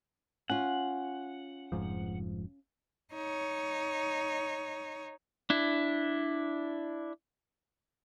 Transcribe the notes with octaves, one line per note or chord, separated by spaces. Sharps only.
C#4 F4 F#5
F1 G#2 F3
D#4 C#5
D4 E4